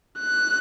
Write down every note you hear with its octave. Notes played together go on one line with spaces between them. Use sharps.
F#6